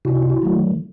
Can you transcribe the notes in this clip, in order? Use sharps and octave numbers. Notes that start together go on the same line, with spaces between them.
C3 E4 F#4
E4
F4
E4 F#4
D#3 F#3 A3